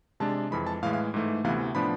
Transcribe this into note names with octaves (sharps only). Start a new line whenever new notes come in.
C3 G#3 D4 A5
F2 E3 G#3 B5
A5
A2 E3 G#3 F5
F5
G#2 E3 A3
D2 C3 E3 B3 F5
A2 F3 B3 D4 B5